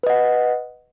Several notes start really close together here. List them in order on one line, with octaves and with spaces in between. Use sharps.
B4 D#5 F#5